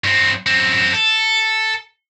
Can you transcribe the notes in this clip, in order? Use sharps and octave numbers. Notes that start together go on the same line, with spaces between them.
G2 C4
F#2 C4
A4